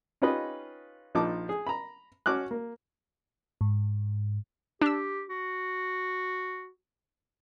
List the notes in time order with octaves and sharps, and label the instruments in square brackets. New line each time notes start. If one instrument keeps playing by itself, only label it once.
[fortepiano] C#4 D#4 F4 G4 B4 D#5
A#1 F3 D#4 A5 D6
G#4
A#5 B5
C#4 F#4 D6 F6 F#6
A#3
[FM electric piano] G#2
[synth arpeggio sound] D4 E6 [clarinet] G4
[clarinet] F#4